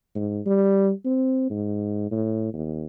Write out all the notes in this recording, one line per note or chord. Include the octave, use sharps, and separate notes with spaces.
G#2
G3
C4
G#2
A2
D#2